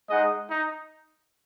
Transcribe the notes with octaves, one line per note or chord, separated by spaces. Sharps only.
G#3 D#4 G#4 D#5 F#5
D#4